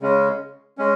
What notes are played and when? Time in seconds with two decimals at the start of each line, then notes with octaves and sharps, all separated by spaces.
0.02 C#3 G#3 C#4
0.78 G#3 C#4